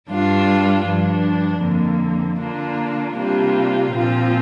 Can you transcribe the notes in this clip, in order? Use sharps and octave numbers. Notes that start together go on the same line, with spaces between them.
G2 G3 D4 F4
G2 F3 D4
F2 D3 A#3
D3 A#3 D4 F4
C3 G3 A#3 D4 F4
A#2 F3 C4 F4